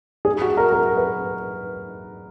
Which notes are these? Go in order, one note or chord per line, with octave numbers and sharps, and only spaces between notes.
G#4
F#4
A#4
A#4
B4